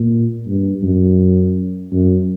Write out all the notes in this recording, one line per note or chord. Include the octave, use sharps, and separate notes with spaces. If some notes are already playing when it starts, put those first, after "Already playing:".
Already playing: A#2
G2
F#2
F#2